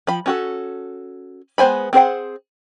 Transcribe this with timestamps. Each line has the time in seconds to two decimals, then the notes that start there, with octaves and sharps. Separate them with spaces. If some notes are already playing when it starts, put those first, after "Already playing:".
0.07 F3 B5
0.26 C#4 F#4 A4
1.58 G#3 B3 C5 G#5 B5
1.93 C4 G#4 C5 F#5